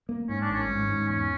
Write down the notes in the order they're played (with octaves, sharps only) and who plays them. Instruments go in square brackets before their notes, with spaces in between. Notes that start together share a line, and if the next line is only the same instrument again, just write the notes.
[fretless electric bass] A#3
[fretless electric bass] G#2 [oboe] C#4
[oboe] D4
[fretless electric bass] G#1 [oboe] C#4
[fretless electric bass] G#2
G#2
[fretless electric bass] E2 [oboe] C#4